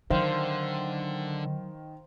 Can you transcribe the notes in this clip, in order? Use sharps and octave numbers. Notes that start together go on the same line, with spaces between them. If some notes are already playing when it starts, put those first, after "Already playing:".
D3 D#3 F#3 C5 F5